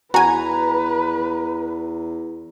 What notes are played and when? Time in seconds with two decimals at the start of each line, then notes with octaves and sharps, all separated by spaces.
0.14 E2 F#4 B4 G#5 A#5